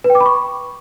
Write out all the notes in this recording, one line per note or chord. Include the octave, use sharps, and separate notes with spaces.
B4
G5
D6
B5
C#6